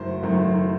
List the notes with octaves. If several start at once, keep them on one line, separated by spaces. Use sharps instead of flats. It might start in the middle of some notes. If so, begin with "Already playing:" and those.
Already playing: F#1 F#2 D#3 F#3 A3 C5
F#1 F#2 D#3 F#3 A3